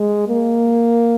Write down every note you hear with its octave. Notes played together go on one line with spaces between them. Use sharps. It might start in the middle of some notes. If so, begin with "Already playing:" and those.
Already playing: G#3
A#3